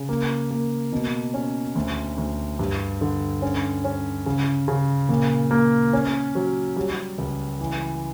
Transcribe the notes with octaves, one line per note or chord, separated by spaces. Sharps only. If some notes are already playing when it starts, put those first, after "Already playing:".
Already playing: C#3
A#3
A#3
B2
C#4
D2
D2
G2
D3
C#4
C#4
C#3
C#3
A#2
A#3
C#4
F#3
G3
C#2
E3